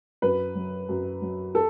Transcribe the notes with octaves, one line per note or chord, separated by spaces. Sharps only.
F#2 B4
F#3
F#2
F#3
A4